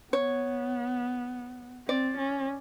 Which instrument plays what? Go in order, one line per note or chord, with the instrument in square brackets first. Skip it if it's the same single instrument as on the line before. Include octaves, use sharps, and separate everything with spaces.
[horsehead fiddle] B3 [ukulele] C#5
[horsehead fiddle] C4 [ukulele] D5
[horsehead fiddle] C#4